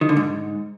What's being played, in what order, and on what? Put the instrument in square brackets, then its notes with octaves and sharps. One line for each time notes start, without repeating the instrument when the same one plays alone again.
[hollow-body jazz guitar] D#3
D3
G#2